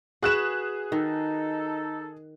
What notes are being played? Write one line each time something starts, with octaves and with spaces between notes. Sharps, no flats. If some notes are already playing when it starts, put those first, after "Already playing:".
F#4 G#4 B4 F#6 E7
D#3 D#4 A4